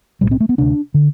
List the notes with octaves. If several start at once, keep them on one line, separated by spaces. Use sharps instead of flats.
B1 A2 G3
C4
A3
B3
D2 C3 D4
D3